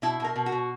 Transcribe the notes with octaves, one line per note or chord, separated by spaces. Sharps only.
B2 E4
B2 A#4
B2
F#4
B2